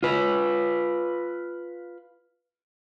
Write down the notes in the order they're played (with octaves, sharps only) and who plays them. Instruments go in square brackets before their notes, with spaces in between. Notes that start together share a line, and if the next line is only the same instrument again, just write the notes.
[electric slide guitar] F4 B4